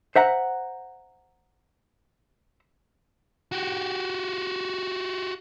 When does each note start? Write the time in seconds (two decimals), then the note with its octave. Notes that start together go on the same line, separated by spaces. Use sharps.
0.16 C5 E5 F#5 A#5
3.52 F#4 G4